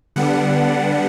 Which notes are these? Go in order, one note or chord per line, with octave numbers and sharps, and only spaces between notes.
D3 G3 B3 D4 F#5